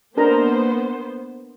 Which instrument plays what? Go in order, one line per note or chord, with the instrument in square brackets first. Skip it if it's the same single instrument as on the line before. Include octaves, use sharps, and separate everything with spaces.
[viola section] A#3 B3 C5 [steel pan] D4 A#4 A#5